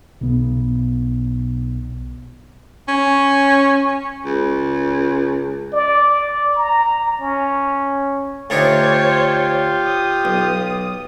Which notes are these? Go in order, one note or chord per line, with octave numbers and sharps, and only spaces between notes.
B1 B3
C#4
C#2
D5
A#5
C#4
D2 D4 D#4 F4 G4 C5 C#5
D#6
B1